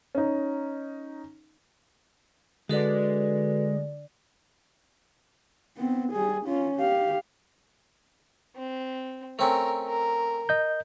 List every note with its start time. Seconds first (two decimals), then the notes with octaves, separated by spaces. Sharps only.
0.15 C#4 D#4
2.69 D3 G#3 F#4 A4 B4 D5
5.77 B3 C4
6.12 G3 G#4
6.45 C#4 F4
6.77 G4 F5
8.57 C4
9.39 A3 C4 C#4 A#4
9.88 A#4
10.49 D#5 G6